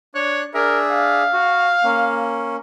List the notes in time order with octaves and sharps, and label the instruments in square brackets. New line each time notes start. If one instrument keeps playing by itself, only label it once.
[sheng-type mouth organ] D4 F#6 [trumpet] C#5
[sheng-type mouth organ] D4 G#4 E5 [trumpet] A#4
[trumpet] F5
[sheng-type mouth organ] F#4
A#3 C#4